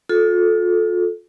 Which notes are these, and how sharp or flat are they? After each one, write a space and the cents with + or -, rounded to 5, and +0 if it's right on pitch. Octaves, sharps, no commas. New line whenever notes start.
F4 +35 A4 -10